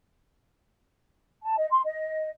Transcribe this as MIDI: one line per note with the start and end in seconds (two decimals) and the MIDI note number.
1.43 1.57 81
1.57 1.67 75
1.72 1.80 84
1.85 2.29 75